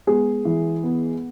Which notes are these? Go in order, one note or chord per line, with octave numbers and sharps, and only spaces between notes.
G#3 B3 G#4
E3
B3